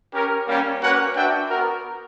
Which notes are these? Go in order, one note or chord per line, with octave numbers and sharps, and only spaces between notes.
C#4 G4 A#4
G3 A#3 C#4 G4
A#3 C#4 F#4 B4 F#5
D4 F#4 B4 E5 G5
B3 F#4 A#4